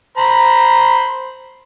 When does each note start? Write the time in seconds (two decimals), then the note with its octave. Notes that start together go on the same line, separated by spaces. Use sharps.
0.18 C5 A#5 B5